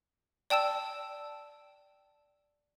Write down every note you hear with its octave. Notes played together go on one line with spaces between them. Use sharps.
D5 G5 A5 E6 E7